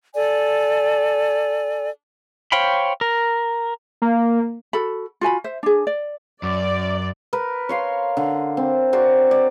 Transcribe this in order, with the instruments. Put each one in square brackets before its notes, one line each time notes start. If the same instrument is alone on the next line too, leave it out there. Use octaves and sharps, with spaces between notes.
[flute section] A4 D5 G#5
[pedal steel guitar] C5 C#5 F5 G5 B5
A#4
[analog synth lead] A#3
[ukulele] F#4 A4 B5
F4 F#4 G#5 B5
C5 E5
D4 G#4
D5
[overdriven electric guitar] F#2 [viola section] D5
[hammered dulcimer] A#4 B4
C#5 F5 C6
D3
C4
F#4 A#4 C5 D5
D5